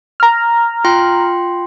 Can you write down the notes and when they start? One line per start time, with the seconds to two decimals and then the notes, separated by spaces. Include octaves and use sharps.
0.20 A#5 F6
0.85 F4 G5 C6